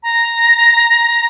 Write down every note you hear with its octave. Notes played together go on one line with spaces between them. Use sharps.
A#5